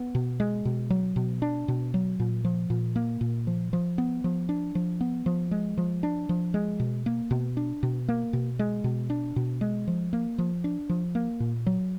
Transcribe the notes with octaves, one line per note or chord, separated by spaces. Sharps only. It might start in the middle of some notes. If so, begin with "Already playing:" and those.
Already playing: B3
B2
G#3
B2
F#3
B2
D4
B2
F#3
A#2
F3
A#2
A#3
A#2
F3
F3
B3
F3
D4
F3
B3
F3
G#3
F3
D4
F3
G#3
B2
A#3
B2
D4
B2
A#3
B2
G#3
B2
D4
B2
G#3
F3
A#3
F3
D4
F3
A#3
A#2
F#3